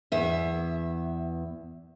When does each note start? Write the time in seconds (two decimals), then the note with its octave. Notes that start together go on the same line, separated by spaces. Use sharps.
0.12 E2 E5